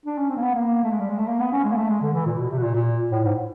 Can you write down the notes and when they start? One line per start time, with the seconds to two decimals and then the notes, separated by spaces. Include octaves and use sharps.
0.06 D4
0.18 C#4
0.30 C4
0.37 A#3
0.42 B3
0.54 A#3
0.83 A3
0.91 G#3
1.00 G3
1.10 G#3
1.18 A3
1.28 A#3
1.40 B3
1.52 C#4
1.64 G#3
1.72 A#3
1.77 A3
1.89 G#3
2.01 D3
2.14 E3
2.26 A#2
2.38 B2
2.51 C3
2.58 B2
2.63 A#2
2.74 A#2
3.12 A2
3.24 G#2